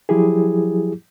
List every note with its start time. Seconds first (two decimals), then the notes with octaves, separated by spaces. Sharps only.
0.09 F3 F#3 E4 G4 G#4